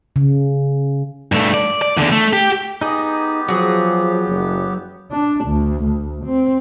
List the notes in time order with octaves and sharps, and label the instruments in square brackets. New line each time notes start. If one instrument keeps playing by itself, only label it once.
[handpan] C#3
[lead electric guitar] G2 A3
D5
D5
E2 D3
A3
G4
[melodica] B3 G4 [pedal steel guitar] D#4 G#4 [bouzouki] D#5
[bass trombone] F3 [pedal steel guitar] F#3 [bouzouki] F#4 G#4
[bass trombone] F#1
[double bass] D4
D2
D2
C4